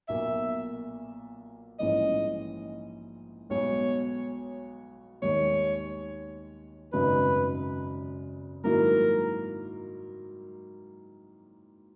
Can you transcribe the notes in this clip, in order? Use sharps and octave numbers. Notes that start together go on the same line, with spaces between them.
B1 A#2 A#3 E5
A#1 G#2 E3 G#3 C#4 D#5
B1 B2 G#3 C#5
D#2 D#3 G#3 C#5
G#1 F#2 C#3 G#3 D#4 B4
G#2 D#3 F#3 A#3 E4 A#4